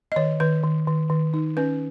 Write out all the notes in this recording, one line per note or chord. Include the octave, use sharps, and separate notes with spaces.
D#5
D#3 C#5
D#3 B4
D#3
D#3
D#3
D#4
C#4 B4